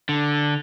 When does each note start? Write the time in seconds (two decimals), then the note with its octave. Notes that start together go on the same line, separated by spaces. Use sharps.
0.09 D3